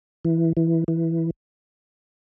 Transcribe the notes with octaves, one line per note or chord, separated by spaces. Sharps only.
E3
E3
E3